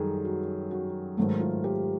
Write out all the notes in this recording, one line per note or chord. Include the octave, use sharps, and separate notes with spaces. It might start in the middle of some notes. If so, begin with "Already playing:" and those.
Already playing: F#2 D#3 G3 G#4 A4
F#4
F#4
G#2 D#3 F#3 A3 F#4
F4
G4